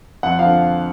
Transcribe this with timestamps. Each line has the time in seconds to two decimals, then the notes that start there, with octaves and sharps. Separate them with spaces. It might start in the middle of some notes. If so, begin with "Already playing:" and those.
0.23 F2 F#5
0.39 F3 F5
0.44 D3